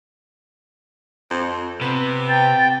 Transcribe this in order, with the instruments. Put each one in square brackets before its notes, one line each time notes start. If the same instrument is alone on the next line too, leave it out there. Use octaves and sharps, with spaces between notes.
[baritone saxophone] F2
[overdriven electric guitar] C3 [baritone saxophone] B3
[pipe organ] G5 [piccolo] A6